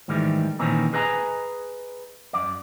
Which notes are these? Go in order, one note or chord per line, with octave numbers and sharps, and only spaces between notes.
G#2 D#3 E3 G3 A3
A#2 D#3 E3 C4 C#4 D#4
G#4 B4 D#5 G#5 A#5
F#2 D5